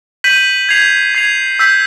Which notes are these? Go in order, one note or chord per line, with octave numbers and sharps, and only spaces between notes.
G6 B6 D#7 F#7
G#6 C7 F7
G#6 C7 F7
E6 G6 B6